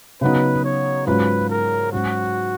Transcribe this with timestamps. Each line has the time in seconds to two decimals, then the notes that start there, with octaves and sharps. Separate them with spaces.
0.21 C#3 F#3 B3 D#4 B4
0.64 C#5
1.07 G#2 F#3 C#4 F4 B4
1.50 A#4
1.92 G#2 F#3 C#4 F#4